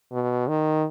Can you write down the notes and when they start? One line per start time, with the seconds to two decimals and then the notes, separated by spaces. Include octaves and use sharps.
0.12 B2
0.48 D#3